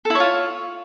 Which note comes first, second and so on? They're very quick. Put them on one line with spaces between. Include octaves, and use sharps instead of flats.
A4 E4 C#5 F4